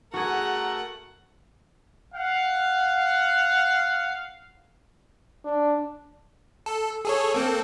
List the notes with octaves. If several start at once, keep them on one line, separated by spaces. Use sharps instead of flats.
A3 F#4 G#4 A#4 F#5
F5 F#5
D4
A4
G#4 A4 C#5
A#3 C4 A4